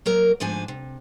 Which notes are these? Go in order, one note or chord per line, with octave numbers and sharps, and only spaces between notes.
F#3 A#3 A#4
D2 G#2 F3 D4 G#5
C3